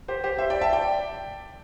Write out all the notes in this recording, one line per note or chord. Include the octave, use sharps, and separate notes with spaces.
G4 C5
G4 C5
C5 E5
D5 G5
E5 A5
D5 G5